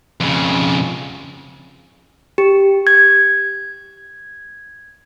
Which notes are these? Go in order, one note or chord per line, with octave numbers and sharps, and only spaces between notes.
F2 C#3
G4
G#6